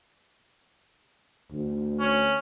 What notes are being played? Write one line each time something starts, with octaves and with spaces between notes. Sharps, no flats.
D2
C#4